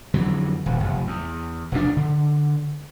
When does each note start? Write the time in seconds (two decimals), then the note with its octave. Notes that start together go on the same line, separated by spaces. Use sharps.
0.14 F2 D3 E3 F#3
0.66 D#1
0.80 F1
1.07 E2
1.72 F1 E2 A2 D4
1.96 D3